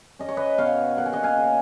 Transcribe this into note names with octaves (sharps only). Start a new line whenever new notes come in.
C#4 D#5
C#5
B4 D#5
B2 C#5 F5
A#3 F#5
G#5
D#5 F#5
F5 G#5
C#3